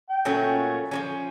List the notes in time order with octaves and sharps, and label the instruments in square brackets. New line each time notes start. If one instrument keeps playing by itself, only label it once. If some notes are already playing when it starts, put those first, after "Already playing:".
[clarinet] G5
[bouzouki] A#2 F#3 A3 C#4
F3 G#3 C#4